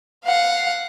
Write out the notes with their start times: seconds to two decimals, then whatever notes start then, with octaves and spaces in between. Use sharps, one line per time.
0.25 F5 F#5